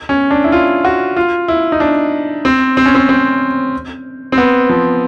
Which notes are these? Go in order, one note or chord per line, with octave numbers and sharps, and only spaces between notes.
C#4
D4
E4
F4
F#4
F4
E4
D#4
D4
C4
C4
C#4
C4
C4
C4
B3
F3